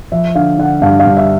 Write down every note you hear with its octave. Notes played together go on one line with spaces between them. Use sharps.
F3 E5
D3 F5
D3 F#5
G2 F5
F5
G2
E5